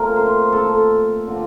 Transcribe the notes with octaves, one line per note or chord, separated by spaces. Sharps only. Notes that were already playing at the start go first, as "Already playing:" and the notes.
Already playing: A#2 A3 C4 A#4
C5
A4
D3 F3 C4